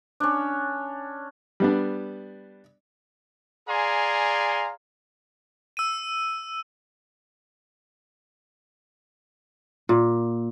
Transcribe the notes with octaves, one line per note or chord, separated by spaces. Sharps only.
C#4 D4
G3 B3 D4
G#4 D5 F5 G#5 A#5 C6
E6 D#7
A#2